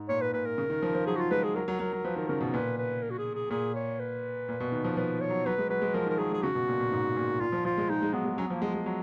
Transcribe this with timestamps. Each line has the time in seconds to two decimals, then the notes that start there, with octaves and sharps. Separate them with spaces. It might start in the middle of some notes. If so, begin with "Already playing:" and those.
Already playing: G#2
0.09 A#2 C#5
0.21 B4
0.33 A#2 B4
0.45 A#4
0.58 C#3
0.70 D#3
0.83 F3
0.94 F3
1.06 F#3 G#4
1.15 F#4
1.19 F4
1.31 G#3 B4
1.44 G#4
1.55 F#3 A#4
1.68 F#3
1.79 F#3 A#4
1.93 F#3
2.05 F3 B4
2.16 D#3 A#4
2.28 C#3 A#4
2.41 B2
2.53 A#2 B4
2.78 B4
3.02 A#4
3.10 F#4
3.18 G#4
3.34 G#4
3.50 A#2 G#4
3.75 C#5
3.99 B4
4.49 A#2
4.60 B2
4.72 D#3
4.84 F3
4.96 F3 B4
5.21 C#5
5.30 F#3
5.46 F#3 B4
5.58 G#3
5.70 F#3 B4
5.82 G#3
5.94 F3 A#4
6.06 D#3
6.09 A#4
6.18 F#3 G#4
6.31 G#3
6.34 G#4
6.42 C#3 F#4
6.55 B2
6.68 A#2
6.80 A#2
6.92 G#2
7.16 A#2
7.40 A#2 F4
7.52 F3
7.65 F3 F4
7.78 G#3
7.89 G#3 D#4
8.02 G#3
8.13 F#3 B3
8.25 G#3
8.38 F#3 C#4
8.46 B3
8.50 F3
8.54 A#3
8.62 G#3 B3
8.74 G#3
8.86 F#3